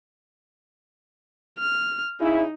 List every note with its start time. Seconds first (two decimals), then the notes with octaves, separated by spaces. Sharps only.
1.59 F6
2.20 C#3 D#4 E4